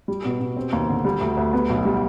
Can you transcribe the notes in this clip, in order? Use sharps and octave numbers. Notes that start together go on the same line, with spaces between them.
G3
B2
B2
C4
D#2
D3
G3
D2
D2
B3
B1
G3